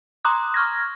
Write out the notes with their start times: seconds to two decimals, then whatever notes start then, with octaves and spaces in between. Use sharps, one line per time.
0.25 A#5 C6 D6 D#6 F#6
0.54 C#6 F6 G#6 A#6